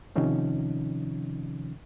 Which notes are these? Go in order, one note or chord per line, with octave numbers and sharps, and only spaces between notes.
C3 D#3 F3 C#4 D#4